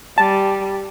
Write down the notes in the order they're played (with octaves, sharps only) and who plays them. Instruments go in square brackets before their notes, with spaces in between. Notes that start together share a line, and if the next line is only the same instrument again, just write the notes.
[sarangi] G3 [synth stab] A5